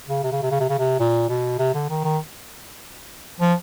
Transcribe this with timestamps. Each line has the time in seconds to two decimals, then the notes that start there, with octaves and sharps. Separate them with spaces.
0.09 C#3
0.24 C3
0.32 C#3
0.42 C3
0.51 C#3
0.60 C3
0.69 C#3
0.79 C3
0.99 A#2
1.29 B2
1.59 C3
1.74 D3
1.89 D#3
2.04 D#3
3.40 F3